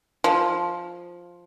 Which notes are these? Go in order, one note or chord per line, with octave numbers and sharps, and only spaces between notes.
F3